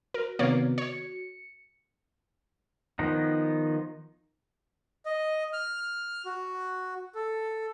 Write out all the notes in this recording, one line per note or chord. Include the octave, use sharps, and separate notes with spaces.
F#4 A#4
C3 D#3 A#3 B3 C#5 D5
C#5 C#7
D#3 F3 B3 D#4
D#5
F6
F#4
A4